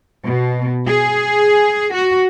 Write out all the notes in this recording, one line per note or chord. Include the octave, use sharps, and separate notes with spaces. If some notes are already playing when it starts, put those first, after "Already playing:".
B2
G#4
F#4